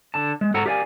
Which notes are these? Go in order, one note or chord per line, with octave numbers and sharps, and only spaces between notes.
D3 A5
G#3
G#2 A4 F#5 A#5
G4 A#4 D5 F5 G#5